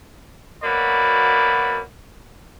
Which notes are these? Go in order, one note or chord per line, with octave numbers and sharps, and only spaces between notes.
B2 F#3 A#3 D5 B5